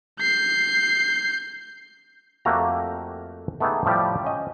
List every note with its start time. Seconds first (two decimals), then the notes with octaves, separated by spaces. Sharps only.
0.20 G6 C7
2.45 F2 A3 A#3 F#4 G4 A#5
3.60 A3 B3 D#4 G4 G#4
3.85 A2 F3 G3 G4
4.24 C#4 D#5